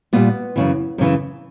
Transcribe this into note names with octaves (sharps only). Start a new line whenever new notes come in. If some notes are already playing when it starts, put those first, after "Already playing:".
A#2 G3 B3
F#2 C#3 E3
F#2 C#3 E3